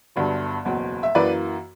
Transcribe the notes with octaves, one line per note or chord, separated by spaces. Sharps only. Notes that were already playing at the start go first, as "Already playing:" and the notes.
G1 G2 D3 F#3
F#1 E2 B2 F#3
E5
F#2 E3 A#3 B4 D5